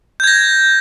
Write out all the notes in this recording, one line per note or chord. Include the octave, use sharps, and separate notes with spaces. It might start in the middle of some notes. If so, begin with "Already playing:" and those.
G6 G#6 A#6